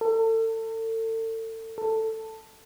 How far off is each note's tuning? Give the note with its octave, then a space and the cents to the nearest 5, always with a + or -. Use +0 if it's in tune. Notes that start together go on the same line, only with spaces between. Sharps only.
A4 +35
A4 +10